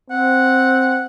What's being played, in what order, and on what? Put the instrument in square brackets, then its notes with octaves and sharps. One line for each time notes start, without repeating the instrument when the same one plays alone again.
[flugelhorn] C4 [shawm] F#5